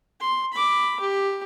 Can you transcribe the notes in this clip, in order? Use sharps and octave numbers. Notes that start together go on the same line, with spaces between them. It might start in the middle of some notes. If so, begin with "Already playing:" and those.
C6
B5 D6
G4